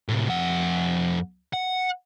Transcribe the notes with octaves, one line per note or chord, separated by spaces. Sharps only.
A2 C3
F2 F#5
F#5